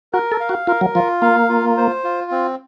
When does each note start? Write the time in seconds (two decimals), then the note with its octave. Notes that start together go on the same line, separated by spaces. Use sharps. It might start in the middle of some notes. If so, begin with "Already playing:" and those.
0.13 F#4 A#4
0.32 A4
0.40 F5
0.49 F#4
0.67 F4 A#4
0.81 F#3
0.95 F3 F4
1.22 A#3 F5
1.49 F4
1.77 C5
2.04 F4
2.31 C4